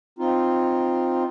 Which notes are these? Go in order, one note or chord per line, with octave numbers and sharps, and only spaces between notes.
C4 D#4 F4